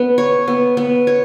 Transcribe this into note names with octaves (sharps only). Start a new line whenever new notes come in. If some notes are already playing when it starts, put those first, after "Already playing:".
Already playing: B3
C#5
B3
B3
C#5